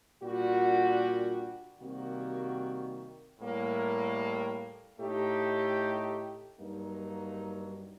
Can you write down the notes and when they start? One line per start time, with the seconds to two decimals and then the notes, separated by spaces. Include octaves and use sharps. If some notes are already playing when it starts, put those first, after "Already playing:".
0.20 A#2 G3 D4 F#4
1.80 C3 D#3 G3 A#3 F#4
3.39 A2 G3 A#3
4.99 A2 A3 D#4 G4
6.58 G2 F#3 A#3 D#4